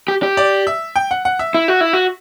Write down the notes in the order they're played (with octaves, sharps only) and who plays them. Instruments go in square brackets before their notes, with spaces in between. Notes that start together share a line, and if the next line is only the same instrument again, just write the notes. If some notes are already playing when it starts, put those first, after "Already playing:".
[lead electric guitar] G4
G4
[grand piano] D5
E5
G5
F#5
F#5
E5
[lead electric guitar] E4
F#4
E4
F#4